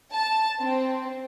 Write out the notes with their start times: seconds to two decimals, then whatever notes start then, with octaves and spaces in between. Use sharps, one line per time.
0.13 A5
0.60 C4